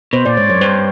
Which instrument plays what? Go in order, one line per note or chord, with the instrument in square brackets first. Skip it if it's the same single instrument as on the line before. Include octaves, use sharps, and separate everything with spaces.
[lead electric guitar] B2 [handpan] C5
[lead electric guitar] A#2 [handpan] D5
[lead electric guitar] G#2 [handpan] C#5
[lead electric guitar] F#2 [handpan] C#5
[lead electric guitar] G2 [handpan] C5